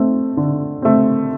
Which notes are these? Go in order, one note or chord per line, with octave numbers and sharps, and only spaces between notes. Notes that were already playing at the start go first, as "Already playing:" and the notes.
Already playing: A3 C4
D3
A3 C4